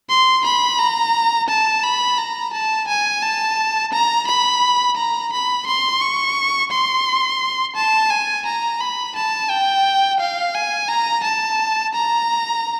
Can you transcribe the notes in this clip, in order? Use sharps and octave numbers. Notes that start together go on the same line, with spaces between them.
C6
B5
A#5
A5
B5
A#5
A5
G#5
A5
A#5
B5
A#5
B5
C6
C#6
C6
A5
G#5
A#5
B5
A5
G5
F5
G#5
A#5
A5
A#5